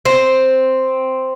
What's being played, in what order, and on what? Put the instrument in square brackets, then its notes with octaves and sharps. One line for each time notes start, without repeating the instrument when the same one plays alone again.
[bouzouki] C4